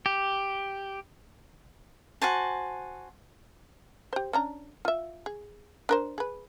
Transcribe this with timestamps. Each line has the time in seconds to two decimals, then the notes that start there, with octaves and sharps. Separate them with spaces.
0.06 G4
2.22 F#4 C5 G#5 A5
4.13 G4 C5
4.33 C#4 D4 A#5
4.85 F4 E5
5.26 G#4
5.89 D4 A#4 C5
6.18 G#4 B4